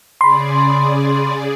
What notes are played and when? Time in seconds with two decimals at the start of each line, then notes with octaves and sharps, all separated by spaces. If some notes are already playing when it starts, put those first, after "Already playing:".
0.21 C#3 G#4 D5 B5 C6